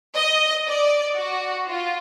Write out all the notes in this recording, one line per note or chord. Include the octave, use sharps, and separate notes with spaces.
D#5
D5
F#4
F4